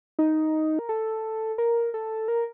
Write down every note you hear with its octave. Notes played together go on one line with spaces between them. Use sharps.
D#4
A#4
A4
A#4
A4
A#4